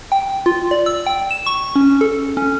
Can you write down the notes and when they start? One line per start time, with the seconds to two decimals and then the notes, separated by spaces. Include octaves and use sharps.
0.12 G5
0.46 F4
0.71 D5
0.86 E6
1.06 G5
1.31 E7
1.46 C#6
1.75 C#4
2.01 A4
2.37 C#4